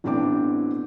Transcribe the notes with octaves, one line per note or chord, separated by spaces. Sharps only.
A1 B2 C4 D4 G5 D6